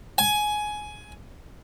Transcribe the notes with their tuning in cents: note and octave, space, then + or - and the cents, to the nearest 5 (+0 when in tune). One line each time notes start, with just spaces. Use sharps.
G#5 +15